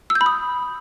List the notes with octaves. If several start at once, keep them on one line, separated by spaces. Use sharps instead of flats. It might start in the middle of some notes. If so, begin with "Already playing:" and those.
E6
G6
B5
D#6